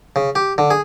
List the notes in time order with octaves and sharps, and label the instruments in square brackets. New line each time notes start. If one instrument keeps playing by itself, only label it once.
[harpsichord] C#3
G4
D3
G#4